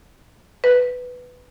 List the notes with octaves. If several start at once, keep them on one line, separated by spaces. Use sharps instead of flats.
B4